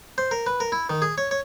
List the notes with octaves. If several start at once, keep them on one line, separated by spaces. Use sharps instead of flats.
C5
A#4
B4
A#4
E4
D#3
G#4
C#5
C#5